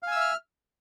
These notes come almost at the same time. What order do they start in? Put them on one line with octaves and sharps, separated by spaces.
F5 G#5 E6 E5 F6